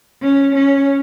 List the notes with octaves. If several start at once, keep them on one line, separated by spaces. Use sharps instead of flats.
C#4
C#4